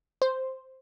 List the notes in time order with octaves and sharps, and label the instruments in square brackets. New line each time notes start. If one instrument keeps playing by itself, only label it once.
[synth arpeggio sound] C5